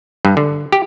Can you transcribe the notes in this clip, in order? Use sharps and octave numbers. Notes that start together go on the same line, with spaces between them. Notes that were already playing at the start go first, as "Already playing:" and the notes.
G2
D3
G4